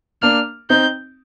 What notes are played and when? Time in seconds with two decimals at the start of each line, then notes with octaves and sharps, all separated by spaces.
0.22 A#3 D4 F6
0.70 C4 D#4 G6